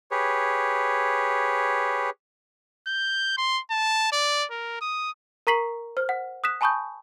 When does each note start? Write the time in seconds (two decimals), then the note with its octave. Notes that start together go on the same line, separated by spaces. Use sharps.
0.11 G4 G#4 B4 C#5
2.87 G6
3.37 C6
3.70 A5
4.12 D5
4.51 A#4
4.81 D#6
5.47 A#4 A#5 C#6 B6 C7 F#7
5.97 C5 F6
6.09 F#5
6.44 D#6 F#6 B6 E7
6.61 G#5 A5 B5 C#6 D#6 G6